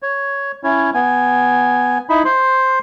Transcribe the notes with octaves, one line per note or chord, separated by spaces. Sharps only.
C#5
C#4 E4 C#5
B3 G#5
D#4 E4 B5
C5 C6